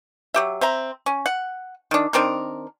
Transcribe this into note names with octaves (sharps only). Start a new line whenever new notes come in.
F#3 G4 E5
C4 E5 A#5
C#4
F#5
D#3 D4
D#3 C4 D4 A#4